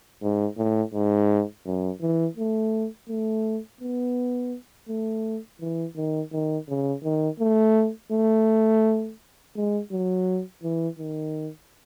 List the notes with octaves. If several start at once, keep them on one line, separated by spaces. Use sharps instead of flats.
G#2
A2
G#2
F#2
E3
A3
A3
B3
A3
E3
D#3
D#3
C#3
D#3
A3
A3
G#3
F#3
E3
D#3